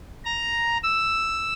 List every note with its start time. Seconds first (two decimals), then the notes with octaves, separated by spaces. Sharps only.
0.25 A#5
0.83 E6